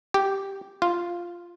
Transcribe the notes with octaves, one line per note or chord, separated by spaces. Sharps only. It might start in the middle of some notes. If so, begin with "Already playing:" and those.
G4
F4